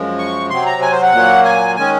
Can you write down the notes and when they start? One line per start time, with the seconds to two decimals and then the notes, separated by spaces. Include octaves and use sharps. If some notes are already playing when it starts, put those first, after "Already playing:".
Already playing: F#2 F3 G#3
0.18 C#6
0.50 C3 F#3 C4 C6
0.66 A#5
0.82 G#5
0.92 C5
1.03 F#5
1.12 A#2 F#3 A#3
1.45 G#5
1.76 D#3 G#3 C#4 G#5